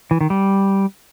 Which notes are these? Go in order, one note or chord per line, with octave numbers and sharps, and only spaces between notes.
E3
D#3
G3